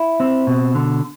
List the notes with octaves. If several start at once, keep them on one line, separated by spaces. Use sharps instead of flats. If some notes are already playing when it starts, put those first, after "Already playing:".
Already playing: E4
C4
B2
D3